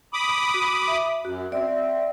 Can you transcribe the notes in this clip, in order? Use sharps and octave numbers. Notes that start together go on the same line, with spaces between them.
B5 D6 D#6
F#4
E5
F#2 F#4
C4 D5 E5